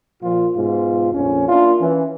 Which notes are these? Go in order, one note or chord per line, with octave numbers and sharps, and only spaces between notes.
A#2 F3 F4
G#2 B2 F4
A#1 F2 C#4
A#3 D4 E4 F4
E3 C#4